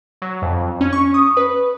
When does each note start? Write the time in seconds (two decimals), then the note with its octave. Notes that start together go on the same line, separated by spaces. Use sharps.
0.22 F#3
0.42 F2
0.81 C#4
0.93 C#6
1.14 D#6
1.37 B4